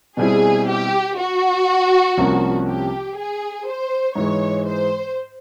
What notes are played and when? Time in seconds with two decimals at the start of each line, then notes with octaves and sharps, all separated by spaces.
0.17 B2 G3 C4 E4 G#4
0.67 G4
1.17 F#4
2.17 C2 C3 F3 A#3 C#4
2.67 G4
3.16 G#4
3.66 C5
4.15 G#2 E3 G#3 C#5
4.66 C5